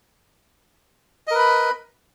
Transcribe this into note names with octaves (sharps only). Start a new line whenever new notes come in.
A#4 B4 D#5 B5